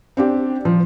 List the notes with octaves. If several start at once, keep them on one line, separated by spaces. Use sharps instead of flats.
C4 D4 G4
F3